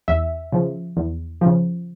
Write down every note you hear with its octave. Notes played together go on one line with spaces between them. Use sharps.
E2 E5
C#3 F3
E2
C#3 F3